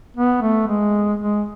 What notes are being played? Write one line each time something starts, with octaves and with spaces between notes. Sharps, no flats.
B3
A3
G#3
G#3